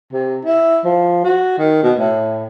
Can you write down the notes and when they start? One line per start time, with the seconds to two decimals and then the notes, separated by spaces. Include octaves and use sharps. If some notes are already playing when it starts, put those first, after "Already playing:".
0.13 C3
0.44 E4
0.85 F3
1.24 F#4
1.58 D#3
1.83 B2
1.99 A2